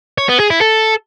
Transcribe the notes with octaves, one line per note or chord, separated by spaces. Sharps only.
C#5
B3
G#4
E4
A4